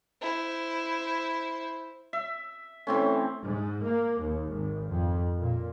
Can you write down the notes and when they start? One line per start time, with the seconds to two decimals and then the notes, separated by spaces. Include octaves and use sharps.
0.21 E4 C5
2.13 E5
2.87 E3 A3 C4 C#4
3.44 G#2
3.83 A#3
4.21 D#2
4.52 G#1
4.88 F2
5.39 A#2